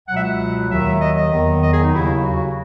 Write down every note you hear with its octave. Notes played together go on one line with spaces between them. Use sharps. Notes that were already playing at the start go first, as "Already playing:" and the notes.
C#2 B2 F#3 F#5
E5
F#5
D#2 D#3 F#3 E5
D#5
D#5
E2 D#3 F#3
D#5
G#4
D#4
D#2 C#3 F#3 E4
F#4